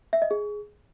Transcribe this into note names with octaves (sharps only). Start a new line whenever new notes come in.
E5
D#5
G#4